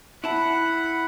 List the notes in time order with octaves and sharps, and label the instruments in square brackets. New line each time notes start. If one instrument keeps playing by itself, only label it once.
[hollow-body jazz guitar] E4 A5 [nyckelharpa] F#5 B5